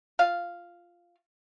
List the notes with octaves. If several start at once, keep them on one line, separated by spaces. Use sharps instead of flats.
F4 F5